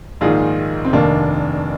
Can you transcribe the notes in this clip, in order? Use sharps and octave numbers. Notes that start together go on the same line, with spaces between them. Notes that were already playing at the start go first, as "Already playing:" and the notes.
A#1 G#2 D#3 F4 G#4
C4
F1 D#2 D#3 A#3 D4